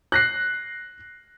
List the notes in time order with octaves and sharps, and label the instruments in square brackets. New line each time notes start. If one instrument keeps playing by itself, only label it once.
[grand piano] F#6 A#6 C7